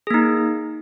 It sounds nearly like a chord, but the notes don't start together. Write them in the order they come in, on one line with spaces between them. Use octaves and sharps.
G#4 A#3 D#4